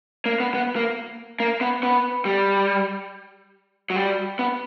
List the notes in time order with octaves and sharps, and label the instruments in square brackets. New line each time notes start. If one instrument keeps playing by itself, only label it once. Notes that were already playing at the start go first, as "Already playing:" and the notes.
[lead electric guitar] A#3
B3
B3
A#3
A#3
B3
B3
G3
F#3
G3
B3